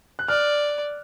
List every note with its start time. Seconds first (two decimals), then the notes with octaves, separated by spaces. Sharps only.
0.19 F#6
0.28 D5 F6